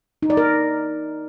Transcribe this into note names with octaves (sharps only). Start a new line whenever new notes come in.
D#4
D5
A#4